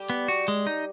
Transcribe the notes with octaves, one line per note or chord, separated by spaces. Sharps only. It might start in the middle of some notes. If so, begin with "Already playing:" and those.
Already playing: G3 G4
B3
F#4
G#3
D#4